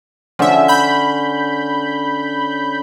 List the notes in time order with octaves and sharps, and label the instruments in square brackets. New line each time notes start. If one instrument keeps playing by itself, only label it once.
[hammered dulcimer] D3 C#4 [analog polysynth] F3 E5
[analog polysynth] B5 G6